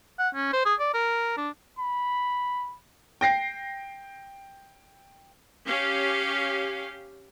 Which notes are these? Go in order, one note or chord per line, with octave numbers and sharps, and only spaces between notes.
F#5
C#4
C5
G#4
D5
A#4
D4
B5
G5 A#6 C7
C#4 G4 F5